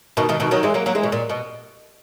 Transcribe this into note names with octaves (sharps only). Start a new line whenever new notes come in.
B2 D#3
B2 D#3
B2 D#3
D#3 F#3
E3 G#3
F#3 A#3
F#3 A#3
E3 G#3
B2
A#2
B2